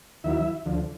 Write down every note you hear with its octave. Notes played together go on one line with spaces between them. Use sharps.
D#2 D#3 F#3 E4 E5
D2 D3 F3